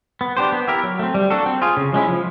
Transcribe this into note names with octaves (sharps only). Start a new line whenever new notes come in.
B3
D4 G4 C5
B3
E4 G4 A#4
F#3
A3 C4
G3
A#3 D4 F#4 A4
C4
F4 G#4
C#3
F3 G#3 C#4 E4
F3